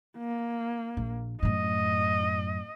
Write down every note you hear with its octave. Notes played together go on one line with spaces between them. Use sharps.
A#3
A#1
F#2 A2 D#5